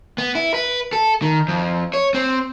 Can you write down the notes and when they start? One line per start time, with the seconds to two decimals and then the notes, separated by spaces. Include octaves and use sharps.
0.18 B3
0.35 E4
0.54 B4
0.93 A4
1.22 D#3
1.48 F2
1.94 C#5
2.14 C4